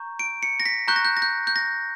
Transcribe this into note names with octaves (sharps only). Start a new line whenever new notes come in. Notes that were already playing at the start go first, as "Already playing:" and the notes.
Already playing: A#5 C#6 G6
D7
C#7
A#6
B6
A#5 C#6 F#6 G6
A#6
G6
A#6
G6
G6
A#6